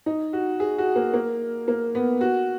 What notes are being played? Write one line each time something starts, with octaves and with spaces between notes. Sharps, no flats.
D#4
F#4
G#4
F#4
A#3
A#3
A#3
B3
F#4